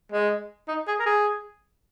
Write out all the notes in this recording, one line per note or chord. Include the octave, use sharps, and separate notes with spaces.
G#3
D#4
G#4
A#4
G#4